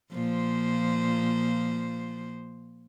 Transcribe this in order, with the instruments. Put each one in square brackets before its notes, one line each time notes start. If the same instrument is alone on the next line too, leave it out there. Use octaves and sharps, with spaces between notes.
[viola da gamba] A#2 F3 C5